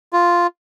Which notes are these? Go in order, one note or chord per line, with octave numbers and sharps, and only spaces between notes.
F4